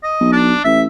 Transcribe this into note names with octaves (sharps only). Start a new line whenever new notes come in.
D#5
B1
D4
A1 E5